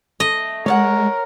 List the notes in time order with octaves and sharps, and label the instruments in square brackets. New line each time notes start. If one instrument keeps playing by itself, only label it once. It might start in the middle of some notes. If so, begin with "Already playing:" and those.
[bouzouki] A3 [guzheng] D#5
[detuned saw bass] G#3 [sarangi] A#4 [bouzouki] C#5 D5 F#5